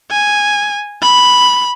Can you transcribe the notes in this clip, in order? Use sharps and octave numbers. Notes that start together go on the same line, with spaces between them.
G#5
B5